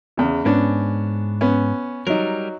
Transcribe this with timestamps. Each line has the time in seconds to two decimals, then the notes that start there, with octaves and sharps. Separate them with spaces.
0.17 E2 C#3
0.45 G#2 B3 C#4 D4
1.41 B3 C#4
2.07 F#3 G3 D#4 A#4